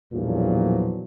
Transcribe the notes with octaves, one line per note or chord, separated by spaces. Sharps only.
B1 E2 G2 A#2 F3 F#3